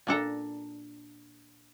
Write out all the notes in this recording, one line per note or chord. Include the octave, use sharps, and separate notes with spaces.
A#2 D4 A4 A#5